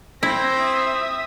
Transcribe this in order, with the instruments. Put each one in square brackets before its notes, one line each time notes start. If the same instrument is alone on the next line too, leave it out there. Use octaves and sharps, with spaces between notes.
[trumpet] C4 [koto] E4 [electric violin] G6 A#6
[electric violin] E5 D#6